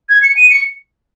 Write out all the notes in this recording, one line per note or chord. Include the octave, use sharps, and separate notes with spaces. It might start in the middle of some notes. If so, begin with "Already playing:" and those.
G#6
C#7
D#7
C#7